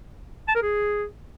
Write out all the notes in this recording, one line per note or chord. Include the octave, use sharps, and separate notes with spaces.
A5
A#4
G#4